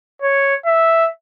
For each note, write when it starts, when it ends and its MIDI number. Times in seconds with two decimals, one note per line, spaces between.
0.22 0.55 73
0.66 1.09 76